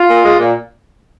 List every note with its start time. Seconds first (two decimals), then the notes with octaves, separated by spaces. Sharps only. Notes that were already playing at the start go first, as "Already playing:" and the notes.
Already playing: F4
0.09 A#2
0.24 G#3
0.39 A#2